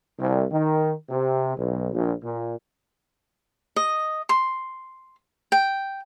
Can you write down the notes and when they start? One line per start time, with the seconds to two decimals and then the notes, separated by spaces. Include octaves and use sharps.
0.19 C2
0.52 D#3
1.10 C3
1.57 B1
1.93 A#1
2.23 A#2
3.76 D#5
4.29 C6
5.52 G5